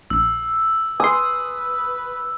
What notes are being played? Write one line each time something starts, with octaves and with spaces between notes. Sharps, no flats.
A#1 E6
B4 G#5 C6 D#6